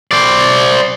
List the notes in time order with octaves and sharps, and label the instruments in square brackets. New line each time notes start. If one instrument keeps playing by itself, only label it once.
[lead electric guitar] C5 D5